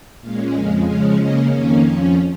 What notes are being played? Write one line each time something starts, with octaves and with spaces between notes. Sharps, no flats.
A#2 G#3 C#4 F5
F2 C#3 G#3 F5
C#3 F3 G#3 C#4 F5
C#3 A#3 C#4 D#5
F2 D#3 A#3 C#4
F2 F3 C#4 C#5